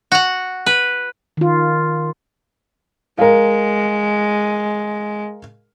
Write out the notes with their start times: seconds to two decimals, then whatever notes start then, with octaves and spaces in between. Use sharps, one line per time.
0.12 F#4 F#5
0.66 B4
1.37 D#3 F4
3.19 G#3 A#4 F5